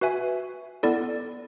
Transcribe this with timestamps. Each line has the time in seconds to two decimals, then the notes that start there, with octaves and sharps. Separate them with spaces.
0.01 F#4 B4 E5 G#5
0.83 B3 E4 A4 D5